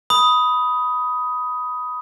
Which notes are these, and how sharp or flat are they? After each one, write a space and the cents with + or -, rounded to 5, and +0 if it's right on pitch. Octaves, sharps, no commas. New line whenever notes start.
B5 +0 D#6 +10